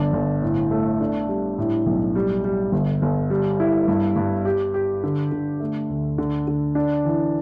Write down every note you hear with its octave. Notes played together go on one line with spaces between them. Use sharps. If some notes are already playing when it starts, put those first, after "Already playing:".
Already playing: G1 D4
G1
A2
A3
D4
G3
A2
B1
G3
G3
G1
G1
G3
E4
G2
G2
G4
G4
D3
D3
A3
D2
D3
D3
D4
E3